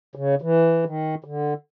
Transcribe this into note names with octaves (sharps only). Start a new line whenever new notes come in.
C#3
E3
D#3
D3